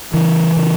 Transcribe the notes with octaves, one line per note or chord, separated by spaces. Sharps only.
C#3 E3
C#3